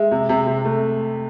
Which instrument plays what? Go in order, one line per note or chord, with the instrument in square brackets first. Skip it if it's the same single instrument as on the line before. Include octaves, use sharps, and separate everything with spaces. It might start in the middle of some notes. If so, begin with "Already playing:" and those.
Already playing: [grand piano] G#3 [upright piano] E5
[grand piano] C3
C3
C3
A3